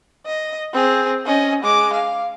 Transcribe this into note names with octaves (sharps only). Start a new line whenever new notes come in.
D#5
C4 G#4
C#4 D#5
G#3 D6
F5